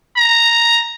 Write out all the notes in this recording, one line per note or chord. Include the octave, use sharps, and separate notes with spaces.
A#5